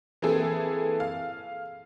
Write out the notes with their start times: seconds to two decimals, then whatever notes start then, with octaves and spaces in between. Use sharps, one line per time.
0.22 E3 A#3 C4 E4 G#4 A4
1.00 F5